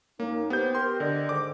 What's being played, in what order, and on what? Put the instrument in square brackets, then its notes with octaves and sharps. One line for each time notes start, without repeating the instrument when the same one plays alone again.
[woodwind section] F#2 D#4 [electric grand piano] A#3
[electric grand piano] B3 G6 [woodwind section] G4 C5
[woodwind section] G4 A#4 [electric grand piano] C6
[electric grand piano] D3 [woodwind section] D5 D#5
[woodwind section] G#2 D3 D#3 [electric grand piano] D6